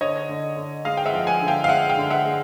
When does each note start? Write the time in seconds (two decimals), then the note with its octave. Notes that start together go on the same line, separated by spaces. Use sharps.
0.01 D3 C#5 D#5
0.29 D3
0.57 D3
0.85 G#3 D#5 F5
0.97 G5
1.06 E5 F#5
1.13 F3
1.27 F#5 G#5
1.41 D3
1.48 F5 G5
1.64 F5
1.68 G#3 E5 F#5
1.89 F5 G5
1.97 D3
2.10 E5 F#5
2.25 G#3